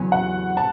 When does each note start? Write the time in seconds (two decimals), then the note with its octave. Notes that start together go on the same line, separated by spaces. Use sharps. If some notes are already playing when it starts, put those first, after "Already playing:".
Already playing: E2 C#3 F#3 C#4
0.12 F#5
0.57 A5